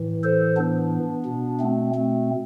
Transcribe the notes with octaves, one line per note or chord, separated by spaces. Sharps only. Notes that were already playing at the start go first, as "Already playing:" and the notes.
Already playing: A2 E3
A4 C5
B3 D4
B2
A3 C4
A3 C4